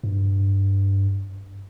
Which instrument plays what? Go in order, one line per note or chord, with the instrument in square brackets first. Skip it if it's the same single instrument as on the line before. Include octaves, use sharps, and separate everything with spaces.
[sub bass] G2